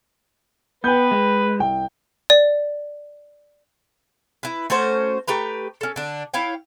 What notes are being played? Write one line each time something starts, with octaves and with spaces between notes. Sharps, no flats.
B3 B4 G5 G6
G#3
C2 G5
D5
E4 B4
A3 C#4 F#4 C5
A3 G4 B4 A#5
C#4 A4
D3 D4
E4 C#5 F5 G5